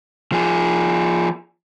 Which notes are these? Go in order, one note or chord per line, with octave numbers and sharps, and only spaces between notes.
F3 G#4